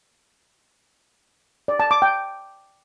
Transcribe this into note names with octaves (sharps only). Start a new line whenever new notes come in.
D5
A5
D6
G5